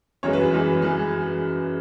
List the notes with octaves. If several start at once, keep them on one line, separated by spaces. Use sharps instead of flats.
F#2 E3 G#3 C#5
B4
G#4
F#2 E3 G#3
E3 G#3 G#4